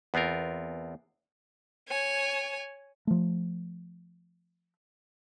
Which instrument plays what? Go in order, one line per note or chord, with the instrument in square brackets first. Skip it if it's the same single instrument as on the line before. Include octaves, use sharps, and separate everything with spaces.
[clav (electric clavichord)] E2 B3 C4 F4 A#4
[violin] C#5 G#5
[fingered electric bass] F3 A3